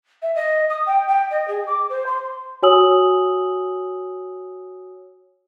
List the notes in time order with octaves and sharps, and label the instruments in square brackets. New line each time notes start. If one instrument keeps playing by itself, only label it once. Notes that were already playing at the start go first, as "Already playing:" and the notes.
[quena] E5
D#5
D#6
G5
G5
D#5
G#4
D6
C5
C6
[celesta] F#4 C#5 G#5 D#6 E6 F#7